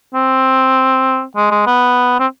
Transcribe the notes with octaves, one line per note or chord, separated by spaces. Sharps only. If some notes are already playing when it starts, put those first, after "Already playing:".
C4
G#3
G#3
B3
C4